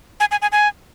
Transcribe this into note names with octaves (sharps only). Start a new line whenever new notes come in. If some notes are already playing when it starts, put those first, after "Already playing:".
G#5
G#5
G#5
G#5